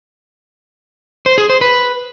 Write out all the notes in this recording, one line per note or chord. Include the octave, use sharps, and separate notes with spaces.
C5
G#4
C5
B4